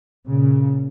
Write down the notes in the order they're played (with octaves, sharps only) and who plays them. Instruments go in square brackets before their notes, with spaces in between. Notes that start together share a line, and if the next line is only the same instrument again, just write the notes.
[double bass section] A#2 C#3